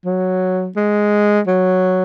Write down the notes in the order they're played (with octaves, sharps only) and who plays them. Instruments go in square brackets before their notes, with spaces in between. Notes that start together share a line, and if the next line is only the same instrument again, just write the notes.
[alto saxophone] F#3
G#3
F#3